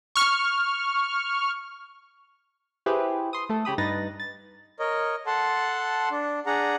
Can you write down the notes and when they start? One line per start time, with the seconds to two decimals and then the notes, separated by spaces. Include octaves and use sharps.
0.16 C#6 F6
2.86 E4 G4 G#4 B4 C5
3.33 C6 D#6
3.49 A3 A4
3.65 C#3 G4 B5 D#6
3.78 G2 D#4 B4 A6 A#6
4.20 A6
4.79 A#4 C#5 D#5
5.26 A4 F#5 A5 C6
6.11 D4
6.46 D4 G#4 F#5 A#5